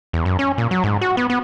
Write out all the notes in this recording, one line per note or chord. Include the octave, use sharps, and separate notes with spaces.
E2
F#2
C#4
A#2
F#3
G#2
F#4
B3
B3